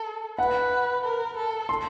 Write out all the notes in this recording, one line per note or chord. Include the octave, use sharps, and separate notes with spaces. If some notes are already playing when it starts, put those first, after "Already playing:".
Already playing: A4
B4 F#5
A#4
A4
C6